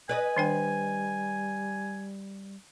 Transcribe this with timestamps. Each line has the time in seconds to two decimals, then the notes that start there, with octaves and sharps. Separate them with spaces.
0.09 B4 D5 D#5 G#5
0.37 D#3 G3 D4 G5